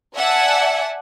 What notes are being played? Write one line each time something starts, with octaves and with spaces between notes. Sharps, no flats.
D5 E5 F#5 G#5 A5